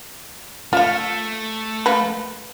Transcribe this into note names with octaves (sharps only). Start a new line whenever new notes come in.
A3 F4 F5
A#3 B4